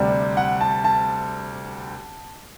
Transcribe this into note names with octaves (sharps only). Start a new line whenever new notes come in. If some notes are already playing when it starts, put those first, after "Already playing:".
Already playing: D2 C3 G3 D5
F#5
A5
A5